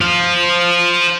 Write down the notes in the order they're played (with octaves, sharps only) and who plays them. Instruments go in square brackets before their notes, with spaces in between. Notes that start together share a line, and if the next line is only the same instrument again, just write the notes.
[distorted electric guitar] C5 F5